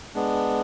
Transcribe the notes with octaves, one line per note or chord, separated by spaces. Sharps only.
G#3 B3 D4